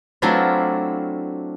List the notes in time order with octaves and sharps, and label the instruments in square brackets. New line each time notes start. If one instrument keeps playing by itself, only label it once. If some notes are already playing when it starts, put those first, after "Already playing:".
[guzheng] F#3 A3 C4 D4 E4 F4